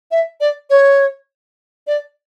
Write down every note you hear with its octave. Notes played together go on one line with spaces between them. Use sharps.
E5
D5
C#5
D5